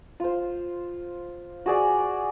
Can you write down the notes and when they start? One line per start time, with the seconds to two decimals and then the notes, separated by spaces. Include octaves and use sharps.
0.20 F4 C5
1.66 F#4 G#4 D5 G#5